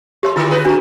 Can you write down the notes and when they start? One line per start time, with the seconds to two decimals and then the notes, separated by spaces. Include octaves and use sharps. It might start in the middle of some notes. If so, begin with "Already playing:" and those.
0.23 G#3 G4 C#5 C6
0.36 D3 D#3 A#3 E4 F4 E6
0.50 D3 G#4 B4
0.65 B2 D4 F#4 A#5